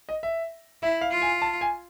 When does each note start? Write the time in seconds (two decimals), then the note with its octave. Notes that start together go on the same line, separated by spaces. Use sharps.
0.09 D#5
0.23 E5
0.82 E4 E5
1.01 F5
1.12 F4
1.22 G#5
1.42 A5
1.61 G#5